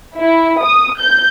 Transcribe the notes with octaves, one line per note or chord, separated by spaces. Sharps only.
E4
D#6
G6